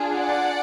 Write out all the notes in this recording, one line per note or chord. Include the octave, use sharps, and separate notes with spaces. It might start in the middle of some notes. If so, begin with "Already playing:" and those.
Already playing: D4 F4 G#4
D5 F#5